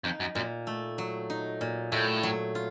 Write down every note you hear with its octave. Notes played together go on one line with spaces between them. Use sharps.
F2 D#4
F#2
F#2 A#2
A3
F#3
D#4
A#2
A2 A3
F#3
F4